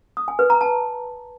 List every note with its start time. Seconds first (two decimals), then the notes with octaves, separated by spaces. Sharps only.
0.17 D#6
0.28 G#5
0.39 B4
0.50 A#5
0.61 A5